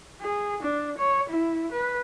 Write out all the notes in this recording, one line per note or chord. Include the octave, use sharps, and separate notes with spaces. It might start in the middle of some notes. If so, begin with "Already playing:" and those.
G#4
D4
C#5
E4
B4